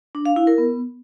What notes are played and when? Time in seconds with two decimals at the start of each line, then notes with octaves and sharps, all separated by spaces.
0.15 D4
0.26 F5
0.36 E4
0.47 A#4
0.58 B3